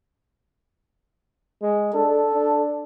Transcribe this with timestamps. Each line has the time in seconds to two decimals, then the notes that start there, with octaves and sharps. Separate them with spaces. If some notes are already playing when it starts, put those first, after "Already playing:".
1.62 G#3
1.94 D4 A4
2.34 D4